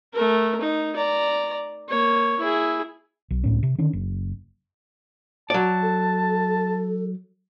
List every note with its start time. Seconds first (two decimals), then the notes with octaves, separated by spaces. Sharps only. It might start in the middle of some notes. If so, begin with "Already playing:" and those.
0.13 A3 A#4
0.61 D#4
0.96 D5 A#5
1.89 A#3 C#5
2.39 E4 G#4
3.30 B1
3.44 C#2 A2 C#4
3.63 C3
3.78 D3 D#3 C#4
3.93 F#1
5.50 F#3 D5 A5
5.82 A4